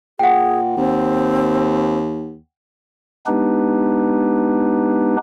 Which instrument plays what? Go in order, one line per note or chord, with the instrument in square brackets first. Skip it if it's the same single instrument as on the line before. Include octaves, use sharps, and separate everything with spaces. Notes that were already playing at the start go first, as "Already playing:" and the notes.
[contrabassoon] A#2 [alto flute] G#4 [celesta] F#5 G5
[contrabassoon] D#2 [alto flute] C4
[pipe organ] G#3 B3 D4 D#4 G4 B4